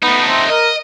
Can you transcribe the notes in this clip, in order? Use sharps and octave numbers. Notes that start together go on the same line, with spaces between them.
A3 B3 D#4
C4
A#4 D#5